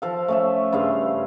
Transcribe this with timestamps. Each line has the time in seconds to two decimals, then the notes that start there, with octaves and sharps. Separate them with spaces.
0.02 F3 A4 F5
0.28 A3 C#4 E5
0.73 G2 C#3 F5 C6